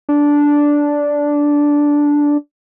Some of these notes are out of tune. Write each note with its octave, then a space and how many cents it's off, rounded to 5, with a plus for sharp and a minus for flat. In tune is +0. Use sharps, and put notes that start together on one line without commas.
D4 -10